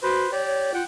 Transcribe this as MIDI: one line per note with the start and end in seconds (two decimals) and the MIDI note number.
0.03 0.27 66
0.03 0.31 71
0.03 0.31 72
0.32 0.72 67
0.32 0.45 73
0.32 0.72 74
0.45 0.73 73
0.74 0.82 65
0.74 0.84 78
0.74 0.84 79